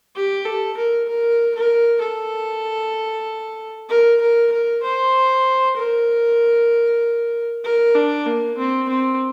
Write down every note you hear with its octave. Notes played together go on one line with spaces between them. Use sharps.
G4
A4
A#4
A#4
A#4
A4
A#4
A#4
A#4
C5
A#4
A#4
D4
A#3
C4
C4